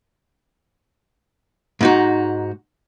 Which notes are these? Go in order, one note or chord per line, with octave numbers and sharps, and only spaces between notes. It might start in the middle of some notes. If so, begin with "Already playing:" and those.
G#2 D#4 F#4